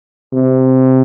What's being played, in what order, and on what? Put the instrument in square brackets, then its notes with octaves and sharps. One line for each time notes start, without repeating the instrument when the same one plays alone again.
[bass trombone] C3